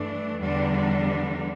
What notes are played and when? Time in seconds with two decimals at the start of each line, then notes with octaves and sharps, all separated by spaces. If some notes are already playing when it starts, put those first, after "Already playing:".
Already playing: G2 E3 A3 D4
0.39 E2 D3 G3 D4